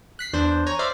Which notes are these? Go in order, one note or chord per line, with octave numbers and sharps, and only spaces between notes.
F#6 B6 C7
E2 D4 C5
C#5 G#5 A#5
C5 D5 E5 F5